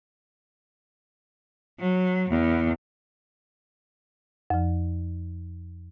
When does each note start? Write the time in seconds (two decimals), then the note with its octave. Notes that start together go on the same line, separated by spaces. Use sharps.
1.79 F#3
2.29 E2
4.50 F2 F3